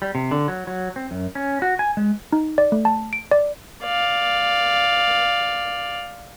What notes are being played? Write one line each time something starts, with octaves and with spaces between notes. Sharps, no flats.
G3
C3
D3
F#3
F#3
C4
F#2
C#4
F#4
G#5
G#3
D#4
D5
A3
A5
D7
D5
D5 F5